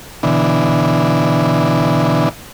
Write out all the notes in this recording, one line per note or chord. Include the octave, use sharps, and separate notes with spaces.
B2 D3 E3